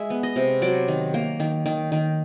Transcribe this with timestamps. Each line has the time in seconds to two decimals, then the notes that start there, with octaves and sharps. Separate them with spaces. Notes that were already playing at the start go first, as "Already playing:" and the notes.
Already playing: G#3 E5
0.10 B3
0.23 D#5
0.36 C3
0.62 F#3 D5
0.88 D#3
1.14 A#3
1.40 D#3
1.66 D#3
1.92 D#3